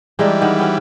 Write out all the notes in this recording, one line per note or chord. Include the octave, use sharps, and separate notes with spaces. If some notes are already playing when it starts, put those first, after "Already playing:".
E3 G3 G#3 D4 D#4
D#3 B3
B3 C#4 F#4